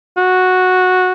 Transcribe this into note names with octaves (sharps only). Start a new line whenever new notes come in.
F#4